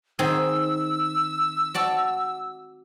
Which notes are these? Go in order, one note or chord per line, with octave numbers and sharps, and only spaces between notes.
D#3 C4 G#4 E6
F#4 D5 A5